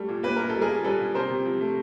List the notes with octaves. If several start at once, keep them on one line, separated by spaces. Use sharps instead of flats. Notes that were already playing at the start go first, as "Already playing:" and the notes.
Already playing: G3 A3
A#2
A#3 B4
A#2 A#4
G3 A4
G#4 A#4
A#2
G3 A4 B4
A#2
C3 A#4 C5
C3
F3
A3